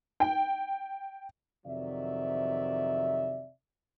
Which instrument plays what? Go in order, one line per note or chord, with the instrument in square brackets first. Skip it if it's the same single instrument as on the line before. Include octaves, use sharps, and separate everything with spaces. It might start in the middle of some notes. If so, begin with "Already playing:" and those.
[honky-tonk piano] G5
[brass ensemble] F2 C3 D#3 F#3 D5 E5